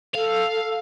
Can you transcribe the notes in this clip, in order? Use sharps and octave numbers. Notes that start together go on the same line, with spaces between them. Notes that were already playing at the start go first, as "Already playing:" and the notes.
A4 F5